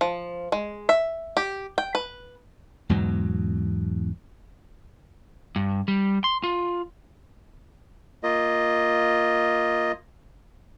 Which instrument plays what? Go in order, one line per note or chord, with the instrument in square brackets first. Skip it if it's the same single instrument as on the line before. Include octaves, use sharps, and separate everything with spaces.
[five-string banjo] F3
G#3
E5
G4
G5
B4
[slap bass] E2 G#2 B2 F#3
[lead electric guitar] G2
G3
C6
F4
[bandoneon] A#3 F4 D#5